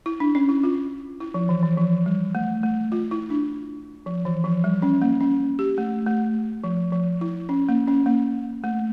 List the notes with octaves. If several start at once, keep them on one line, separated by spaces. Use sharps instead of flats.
E4
D4
C#4
E4
F4
E4
F3
E3
E3
F3
G3
A3
A3
F4
E4
D4
F3
E3
F3
G3
C#4
A#3
C#4
G4
A3
A3
F3
F3
E4
C#4
A#3
C#4
A#3
A3